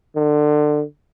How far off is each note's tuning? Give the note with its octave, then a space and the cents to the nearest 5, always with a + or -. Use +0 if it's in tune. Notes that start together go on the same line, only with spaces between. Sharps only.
D3 +25